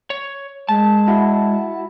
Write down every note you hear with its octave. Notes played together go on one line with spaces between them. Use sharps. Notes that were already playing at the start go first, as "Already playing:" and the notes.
C#5
G#3 A5
E4 F#4